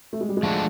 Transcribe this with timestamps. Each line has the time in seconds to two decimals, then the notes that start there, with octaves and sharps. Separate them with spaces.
0.13 A3
0.21 G#3
0.29 G3
0.37 G#3
0.43 F3 A3 D4 F#4 A4